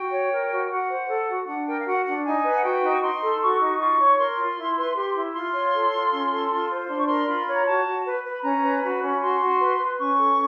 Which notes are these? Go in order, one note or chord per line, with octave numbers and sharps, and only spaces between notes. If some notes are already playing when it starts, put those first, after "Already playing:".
Already playing: F#4 G5
C#5
A#4
F#4
F#4 F#5
C5
A4
F#4
D4 F#5
A#4 G5
F5
F#4 F#5
D4 F#5
D#4 G#5
B4
F#5
F#4 G5
D#4
C#6
D#4 C6
A4
F#4 C#6
D#4
F4 C#6
C#5
A#4 C6
F4
E4
B4
G4
E4
F4 C6
C#5
A4
F4
C#4
A4
F4
C5
D4 C6
C#6
A#4 C6
F4 B5
C#5
A#5
F#4 A5
F#4
B4
B4
B5
C#4 A#5
B4
F#4 B5
C#4
F#4 C6
F#4
B4
B4
C#4 C#6
A4